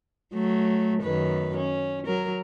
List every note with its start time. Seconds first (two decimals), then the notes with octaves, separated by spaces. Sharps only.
0.34 F#3 A3
1.03 F#2 D#3 B4
1.57 C#4
2.07 F#3 A#4